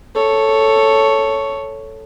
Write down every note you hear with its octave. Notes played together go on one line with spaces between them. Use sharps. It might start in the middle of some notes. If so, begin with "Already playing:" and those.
A4 C#5